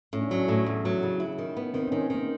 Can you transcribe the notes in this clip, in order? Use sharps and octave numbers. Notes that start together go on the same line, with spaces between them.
A2 C#4
D4
F#3 C#4
A2
E2
F#3
C#3
E4
D#3
B3
D#3 C4
C#4
D#3
C4
D#3 A#3